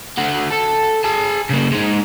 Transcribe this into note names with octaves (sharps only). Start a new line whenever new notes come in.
D3 F#4
A4
G#4 A5
C#3 A#3
G#3 D#4